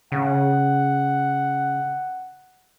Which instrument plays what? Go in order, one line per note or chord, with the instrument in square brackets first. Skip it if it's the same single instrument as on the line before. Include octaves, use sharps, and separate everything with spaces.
[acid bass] C#3 [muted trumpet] F#5